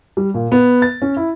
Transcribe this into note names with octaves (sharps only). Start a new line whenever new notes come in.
G3
A#2
B3
A6
C#4
E4